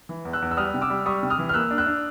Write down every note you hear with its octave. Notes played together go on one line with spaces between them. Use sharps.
E3
E2
E6 F#6
E2
E6
G3 D#6 F6
C3
D6 E6
G3
G3 C#6 D#6
C3
D#6 F6
E3
F6
A#3 E6 F#6
D4
E6 F#6
D4